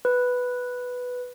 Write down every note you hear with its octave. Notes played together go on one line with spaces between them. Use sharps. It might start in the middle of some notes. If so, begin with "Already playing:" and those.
B4